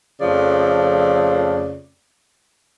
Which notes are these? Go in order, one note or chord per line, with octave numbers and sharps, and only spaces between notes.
F2 C#3 F3 A3 D5